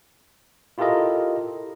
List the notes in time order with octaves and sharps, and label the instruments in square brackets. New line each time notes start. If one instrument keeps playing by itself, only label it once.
[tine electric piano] E4 F4 G4 A4 A#4 D#5